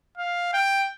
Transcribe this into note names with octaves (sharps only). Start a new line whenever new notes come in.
F5
G5